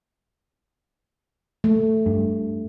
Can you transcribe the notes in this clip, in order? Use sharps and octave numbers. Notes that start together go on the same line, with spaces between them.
A3
G2